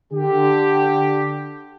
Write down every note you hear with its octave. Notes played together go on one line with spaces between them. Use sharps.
D3 G4